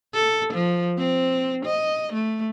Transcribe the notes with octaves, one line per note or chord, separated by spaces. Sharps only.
A4
F3
C4
D#5
A3